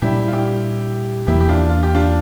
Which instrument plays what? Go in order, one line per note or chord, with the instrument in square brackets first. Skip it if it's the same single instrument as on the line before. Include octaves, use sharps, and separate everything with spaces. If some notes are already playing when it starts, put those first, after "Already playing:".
[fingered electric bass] A#2 G3 A#3 D4 [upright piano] E4 G4
[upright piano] F4
E4 G4
[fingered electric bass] E2 E3 A#3 [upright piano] E4 G4
[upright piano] G4
D4 F4
F4
G4
D4 F4